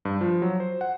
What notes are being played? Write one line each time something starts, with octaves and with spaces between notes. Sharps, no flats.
G2
F3
F#3
C5
F#5